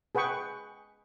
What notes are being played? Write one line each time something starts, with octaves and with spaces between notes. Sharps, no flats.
G#4 B4 F#5 G5 C#6